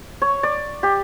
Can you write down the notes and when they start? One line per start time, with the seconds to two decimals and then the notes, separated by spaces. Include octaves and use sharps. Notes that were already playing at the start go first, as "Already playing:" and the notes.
0.22 C#5
0.43 D5
0.83 G4